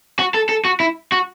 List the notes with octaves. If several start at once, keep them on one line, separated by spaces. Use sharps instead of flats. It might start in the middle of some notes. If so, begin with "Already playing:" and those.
F#4
A4
A4
F#4
E4
F#4